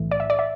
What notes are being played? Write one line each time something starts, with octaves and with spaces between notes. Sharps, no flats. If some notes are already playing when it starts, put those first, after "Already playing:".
Already playing: B1 A2 E3
D5
E5
D5
E5